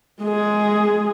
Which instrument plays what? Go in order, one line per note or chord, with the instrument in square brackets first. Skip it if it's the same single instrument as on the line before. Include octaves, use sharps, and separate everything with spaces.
[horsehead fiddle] G#3 G#4